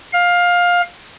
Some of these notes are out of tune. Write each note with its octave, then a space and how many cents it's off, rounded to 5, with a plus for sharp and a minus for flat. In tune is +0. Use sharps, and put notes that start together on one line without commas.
F5 +15